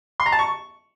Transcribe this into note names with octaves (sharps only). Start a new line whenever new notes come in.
C6
A#5
A5
C#6